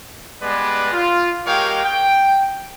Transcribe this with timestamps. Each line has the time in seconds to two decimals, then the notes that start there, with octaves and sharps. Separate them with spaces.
0.41 G3 G#3 B3 B4 D5
0.92 F4
1.46 G#3 G4 A#4 C#5 F5 G5
1.83 G5